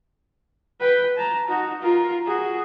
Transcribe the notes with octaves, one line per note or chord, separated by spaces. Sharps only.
B4 G5
A5 A#5
D#4 F#4
F4 A#4
F#4 G#4